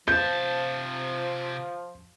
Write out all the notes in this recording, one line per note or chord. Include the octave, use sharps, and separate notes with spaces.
C3 F3 A5 G6